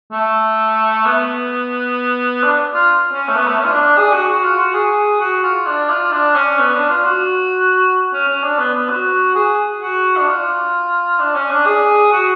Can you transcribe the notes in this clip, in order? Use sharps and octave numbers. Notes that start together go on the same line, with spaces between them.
A3
B3
D4
F4
C#4
A3
B3
A3
C#4
F4
D4
D4
G#4
F#4
F#4
F4
F#4
G#4
F#4
F4
D4
F4
D4
C#4
B3
D4
F4
F#4
C#4
C#4
D4
B3
B3
F#4
G#4
F#4
D4
F4
D4
C#4
D4
G#4
F#4